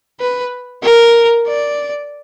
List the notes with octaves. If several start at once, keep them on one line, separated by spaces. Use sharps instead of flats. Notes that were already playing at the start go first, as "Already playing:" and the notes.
B4
A#4
D5